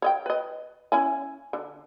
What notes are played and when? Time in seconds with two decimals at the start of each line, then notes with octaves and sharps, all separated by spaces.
0.02 C#5 D#5 G5
0.26 B4 D#5
0.92 C#4 E4 G#5
1.53 D3